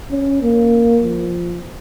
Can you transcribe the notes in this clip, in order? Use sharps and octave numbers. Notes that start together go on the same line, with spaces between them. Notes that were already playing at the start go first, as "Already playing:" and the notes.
C#4
A#3
F3